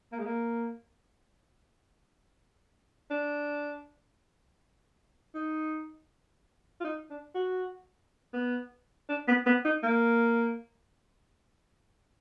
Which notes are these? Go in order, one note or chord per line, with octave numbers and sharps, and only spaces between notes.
A#3
G#3
A#3
D4
D#4
F4
D#4
D4
F#4
B3
D4
B3
B3
D#4
A#3